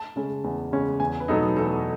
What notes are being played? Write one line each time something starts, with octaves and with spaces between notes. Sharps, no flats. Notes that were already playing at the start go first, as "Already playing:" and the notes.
Already playing: A5
C#3 G#3 C#4
E2
C#3 G#3 C#4
E2 G#5
B4
B2 F#3 B3 D#4 A4
E2 A4